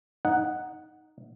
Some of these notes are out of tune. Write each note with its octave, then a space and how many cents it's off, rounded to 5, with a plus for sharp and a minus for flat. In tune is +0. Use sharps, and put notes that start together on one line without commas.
D#4 +0 F#5 +0